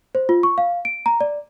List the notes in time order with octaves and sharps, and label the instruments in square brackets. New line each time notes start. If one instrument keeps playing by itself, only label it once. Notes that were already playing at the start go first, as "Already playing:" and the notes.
[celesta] C5
F4
C#6
F5
D7
A#5
D5